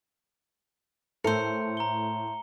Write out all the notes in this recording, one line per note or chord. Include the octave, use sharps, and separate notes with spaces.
A2 A4 A#4 C5 C#7
A#5 G7